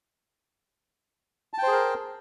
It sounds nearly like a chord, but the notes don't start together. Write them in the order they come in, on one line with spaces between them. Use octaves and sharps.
A5 G5 C5 G#4 A#4